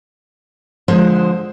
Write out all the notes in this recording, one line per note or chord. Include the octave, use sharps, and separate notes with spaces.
D3 F3 G#3 C5